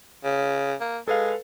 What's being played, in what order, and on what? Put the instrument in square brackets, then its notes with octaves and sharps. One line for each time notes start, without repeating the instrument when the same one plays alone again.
[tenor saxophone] C#3
A#3
[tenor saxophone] G#3 [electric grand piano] A4 B4 F5